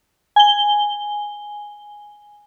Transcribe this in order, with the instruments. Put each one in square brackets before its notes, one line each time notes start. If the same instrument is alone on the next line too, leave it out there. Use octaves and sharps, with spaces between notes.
[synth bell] G#5 G7